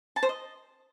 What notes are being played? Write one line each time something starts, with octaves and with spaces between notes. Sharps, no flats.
A5
C5
D#5